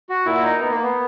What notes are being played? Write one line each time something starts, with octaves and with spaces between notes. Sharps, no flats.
F#4
A#2 E4
D#4
B3
A#3
B3